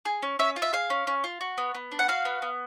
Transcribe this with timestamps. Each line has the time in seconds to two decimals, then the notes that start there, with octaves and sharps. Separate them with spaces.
0.05 G#4
0.23 C#4
0.39 C#4 E5
0.56 F4
0.62 E5
0.73 G#4 F5
0.90 C#4
1.07 C#4
1.24 F4
1.41 F#4
1.58 B3
1.75 B3
1.92 D4
1.99 F#5
2.08 F#4 F5
2.25 B3
2.42 B3